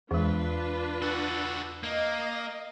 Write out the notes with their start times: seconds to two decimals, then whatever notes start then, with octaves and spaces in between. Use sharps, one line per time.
0.11 E2 E3 G#3 D4 F4 B4
1.02 F#4 A4
1.83 A#3 D#5